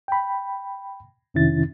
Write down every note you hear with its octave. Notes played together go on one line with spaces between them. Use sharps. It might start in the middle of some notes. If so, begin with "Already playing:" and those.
G5 B5
F2 C3 D#3 C#4 E4 A6